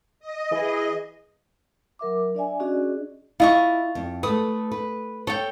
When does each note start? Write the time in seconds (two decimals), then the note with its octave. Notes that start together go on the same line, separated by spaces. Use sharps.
0.20 D#5
0.50 E3 G#4
1.99 F#3 A#4 E5 D6
2.35 D4 D5 E5 G#5
2.60 C#4 D4 F#4 G#4 D5 D#5
3.40 E4 F4 D#5 C#6
3.95 F2
4.23 A3 A4 B4 D#6
4.71 B4
5.27 A4 C#5 G5